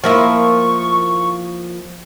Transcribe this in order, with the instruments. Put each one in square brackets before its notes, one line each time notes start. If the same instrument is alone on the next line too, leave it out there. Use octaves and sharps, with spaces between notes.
[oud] F3 A#3 E4 [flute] C#6